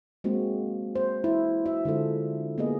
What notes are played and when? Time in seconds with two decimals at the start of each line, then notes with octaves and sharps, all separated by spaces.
0.24 G#3 A#3 C4 F#4
0.95 C5
1.24 E4
1.66 F#4 E5
1.85 D3 G#3 F4 A4 C5
2.58 A#3 B3 G#4 D#5